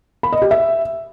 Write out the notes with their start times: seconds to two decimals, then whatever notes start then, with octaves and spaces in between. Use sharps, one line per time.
0.23 B5
0.33 D#5
0.42 G4
0.51 E5